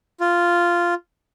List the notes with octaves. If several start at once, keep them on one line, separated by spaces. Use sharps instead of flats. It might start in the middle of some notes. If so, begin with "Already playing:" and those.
F4